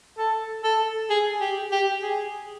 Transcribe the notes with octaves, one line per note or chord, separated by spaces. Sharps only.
A4
A4
G#4
G4
G4
G#4